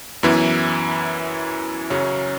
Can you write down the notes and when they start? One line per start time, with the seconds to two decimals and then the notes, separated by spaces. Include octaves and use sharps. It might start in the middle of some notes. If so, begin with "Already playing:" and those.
0.23 F#2 E3 B3 E4
1.90 F#2 C#3 F#3 C#4